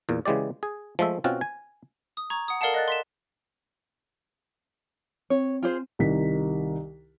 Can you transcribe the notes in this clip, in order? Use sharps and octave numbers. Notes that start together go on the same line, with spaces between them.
E2 A#2
C#3 E3 G#3 G4 D5
G#4
F3 G#3 A3 E5
B2 C4 C#4 F4 F#4
G#5
D#6
A#5 C#6 G#6
F#5 D#6
A4 A#4 D5 F5 F#5 A5
D#5 F#6 A6
C6 B6 E7
C4 C#5
F4 G#4 C5
C2 D#3 B6